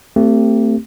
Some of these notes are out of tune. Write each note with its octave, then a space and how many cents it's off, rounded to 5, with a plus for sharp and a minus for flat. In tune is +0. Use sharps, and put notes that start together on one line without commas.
A3 +35 C4 +0 G4 +0